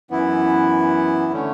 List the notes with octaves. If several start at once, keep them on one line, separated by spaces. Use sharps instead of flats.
F#2 E3 B3 E4
D3 A3 C#4